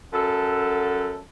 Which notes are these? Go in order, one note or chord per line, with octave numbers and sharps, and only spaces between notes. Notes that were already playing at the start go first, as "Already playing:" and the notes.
F#2 F#4 A4